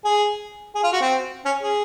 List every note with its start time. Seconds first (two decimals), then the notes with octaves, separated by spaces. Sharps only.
0.04 G#4
0.75 G#4
0.84 F4
0.93 F#4
1.01 C4
1.45 C#4
1.62 G#4